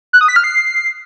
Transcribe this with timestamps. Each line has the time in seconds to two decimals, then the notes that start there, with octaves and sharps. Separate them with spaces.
0.13 F#6
0.21 D#6
0.28 B6
0.36 F6
0.44 C7